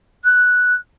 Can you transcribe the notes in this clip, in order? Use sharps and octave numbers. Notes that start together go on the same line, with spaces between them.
F#6